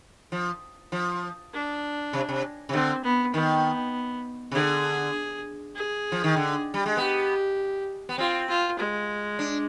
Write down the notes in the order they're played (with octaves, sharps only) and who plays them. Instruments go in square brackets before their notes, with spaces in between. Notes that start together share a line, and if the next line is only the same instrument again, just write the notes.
[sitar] F3
F3
[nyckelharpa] D4
[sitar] C3
C3
C3
[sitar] D3 [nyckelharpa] C4
[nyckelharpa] B3
[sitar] D#3 [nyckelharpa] B3
[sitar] C3
[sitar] D3 [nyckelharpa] G#4
[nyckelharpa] G#4
[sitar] F3
D#3
D3
G3
G#3
[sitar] B3 [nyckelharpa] G4
[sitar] B3
[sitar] C4 [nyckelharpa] F4
[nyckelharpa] F4
G#3
[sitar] D4